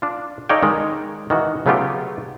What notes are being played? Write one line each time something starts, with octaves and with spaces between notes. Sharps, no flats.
D4 F4
D#4 A4 C#5 D5 F5 G5
D#3 G#3
D#3 E3 F#4
C#3 F#3 A3 B3 F4 G4